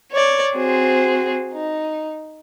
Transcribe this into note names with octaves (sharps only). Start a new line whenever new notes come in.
C#5 D5
C4 F#4 G#4 C5
D#4